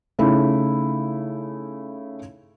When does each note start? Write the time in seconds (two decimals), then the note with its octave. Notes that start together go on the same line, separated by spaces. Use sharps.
0.19 C#3 A3 D#4 E4